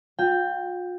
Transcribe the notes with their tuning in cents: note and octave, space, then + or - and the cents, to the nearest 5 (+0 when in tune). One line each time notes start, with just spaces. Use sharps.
F4 +45 G5 +5